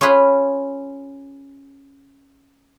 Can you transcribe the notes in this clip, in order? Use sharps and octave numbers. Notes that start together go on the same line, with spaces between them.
C#4 F4 G#4 B4 C6